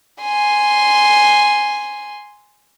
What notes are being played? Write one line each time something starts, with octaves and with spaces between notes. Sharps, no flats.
G#5 C6